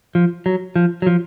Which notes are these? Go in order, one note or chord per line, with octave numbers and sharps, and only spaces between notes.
F3
F#3
F3
F#3
F3